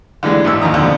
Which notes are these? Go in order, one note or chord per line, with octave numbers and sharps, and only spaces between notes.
D3 E3 G3 G#3
A1 G#2 E6
D#2 D#3 F3 A#5 D#6
F2 B2 D3